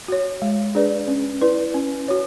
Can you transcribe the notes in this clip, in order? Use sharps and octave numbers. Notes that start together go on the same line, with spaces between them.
F#4 C#5
G#3
D4 G#4 B4 D5
C#4
E4 B4 D5
C#4
F#4 C#5